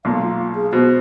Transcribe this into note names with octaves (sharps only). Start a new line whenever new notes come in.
B1 A#2 F5
F4
G#4
B2 C5